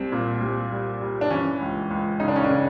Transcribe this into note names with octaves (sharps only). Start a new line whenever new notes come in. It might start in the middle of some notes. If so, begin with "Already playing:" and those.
Already playing: C2 C4
A#2
C2
G3
G3
D4
E3 C#4
C#2
C#2
C#3 D#4
D4
C#4
C#3 D4